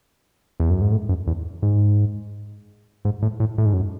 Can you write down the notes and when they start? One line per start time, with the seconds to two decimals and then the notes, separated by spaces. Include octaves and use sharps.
0.60 E2
0.70 F#2
0.81 G#2
0.91 A2
1.09 F#2
1.27 E2
1.62 G#2
3.05 G#2
3.22 A2
3.40 A2
3.58 A2
3.66 G#2
3.73 F#2